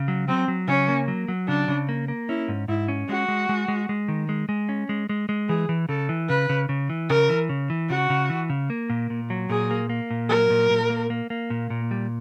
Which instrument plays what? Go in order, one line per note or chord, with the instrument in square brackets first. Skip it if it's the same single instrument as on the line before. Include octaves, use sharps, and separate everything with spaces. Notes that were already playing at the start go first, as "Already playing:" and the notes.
Already playing: [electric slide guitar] C#3
F#3
[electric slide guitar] F#3 [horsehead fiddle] C4
[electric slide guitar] F#3
[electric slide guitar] C#3 [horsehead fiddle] C#4
[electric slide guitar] A#3
F#3
F#3
[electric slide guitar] C#3 [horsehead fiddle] D4
[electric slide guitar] C#3
A#3
A#3
[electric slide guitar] C#4 [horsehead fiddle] E4
[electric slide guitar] G#2
[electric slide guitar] G#2 [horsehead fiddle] E4
[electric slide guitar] C#4
[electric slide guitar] G#3 [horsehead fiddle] F#4
[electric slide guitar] G#3
G#3
G#3
G#3
D#3
G#3
G#3
C#4
G#3
G#3
G#3
[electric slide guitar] E3 [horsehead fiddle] G#4
[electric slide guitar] E3
[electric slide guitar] C#3 [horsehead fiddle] A4
[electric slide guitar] E3
[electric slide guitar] C#3 [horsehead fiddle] B4
[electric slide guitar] C#3
C#3
E3
[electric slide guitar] C#3 [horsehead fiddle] A#4
[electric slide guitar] E3
C#3
E3
[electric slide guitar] C#3 [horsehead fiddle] F#4
[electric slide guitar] C#3
E3
C#3
A#3
A#2
A#2
F#3
[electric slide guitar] A#2 [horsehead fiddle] G#4
[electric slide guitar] A#3
A#3
A#2
[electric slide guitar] F#3 [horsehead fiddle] A#4
[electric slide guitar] A#2
A#2
A#3
A#3
A#3
A#2
A#2
G3